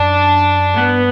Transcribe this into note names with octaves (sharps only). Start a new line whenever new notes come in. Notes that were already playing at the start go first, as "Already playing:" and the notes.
Already playing: F#2 D4
G2 B3